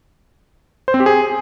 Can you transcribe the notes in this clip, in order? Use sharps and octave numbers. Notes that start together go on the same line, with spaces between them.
C5
C4
G4
G#4